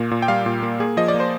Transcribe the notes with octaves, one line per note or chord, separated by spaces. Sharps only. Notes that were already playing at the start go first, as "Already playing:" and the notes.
Already playing: A#2 A#3
A#2
G5
G3 F5
A#2
A#3
A#3 G#4
F3 D#5
D5
A#3
C5